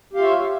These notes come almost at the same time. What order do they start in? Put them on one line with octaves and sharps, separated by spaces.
G4 F5 F4 E5 C#5